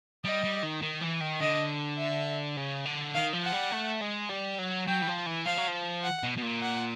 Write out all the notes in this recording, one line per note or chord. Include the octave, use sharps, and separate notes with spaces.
G3 D#5
G3
D#3
D#3
E3
D#3
D3 D#5
E5
C#3
D3
D#3 F5
F3
F#5
G3
A3
G#3
G3
F#3
F#3 G5
E3
F3
E3
F3 F5
F#3
F3
F#5
B2
B2
A#2
F#5